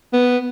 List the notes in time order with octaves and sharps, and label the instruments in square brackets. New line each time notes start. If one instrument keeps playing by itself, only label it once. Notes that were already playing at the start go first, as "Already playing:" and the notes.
[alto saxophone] B3